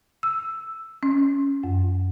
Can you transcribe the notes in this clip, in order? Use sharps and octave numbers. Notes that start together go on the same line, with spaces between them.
E6
C#4
F#2